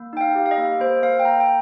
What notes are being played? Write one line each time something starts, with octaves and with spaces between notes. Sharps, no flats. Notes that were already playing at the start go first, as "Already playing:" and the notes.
Already playing: A#3
D#4 G5
F5
G4
F5
D#5
A#3
A#3 C5
A#3 F5
G5
A#3 A#5
G5